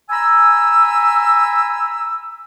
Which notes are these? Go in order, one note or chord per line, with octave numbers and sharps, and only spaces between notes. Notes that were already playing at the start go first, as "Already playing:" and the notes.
G#5 A#5 B5 E6